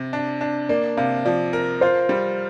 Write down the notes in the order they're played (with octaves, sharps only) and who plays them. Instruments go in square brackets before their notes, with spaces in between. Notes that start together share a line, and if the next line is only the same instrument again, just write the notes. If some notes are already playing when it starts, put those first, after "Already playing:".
Already playing: [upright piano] C3
D4
D4
[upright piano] A#3 [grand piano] D5
[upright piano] C3 [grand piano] F5
[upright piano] F3 [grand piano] D5
[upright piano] A#4
[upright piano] F4 [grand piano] C5
[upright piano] G3